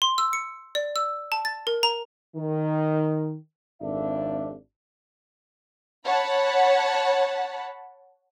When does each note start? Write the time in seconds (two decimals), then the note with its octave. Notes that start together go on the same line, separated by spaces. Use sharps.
0.02 C6
0.18 E6
0.33 C#7
0.75 D5
0.96 E6
1.32 A5
1.45 A6
1.67 A#4
1.83 A#5
2.36 D#3
3.81 G#1 F2 D4 E5
6.05 C#5 F#5 A5 B5